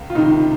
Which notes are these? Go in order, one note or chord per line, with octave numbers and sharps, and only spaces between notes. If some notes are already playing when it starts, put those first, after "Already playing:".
Already playing: C#2
F4
C#2 C3 D#3 D#4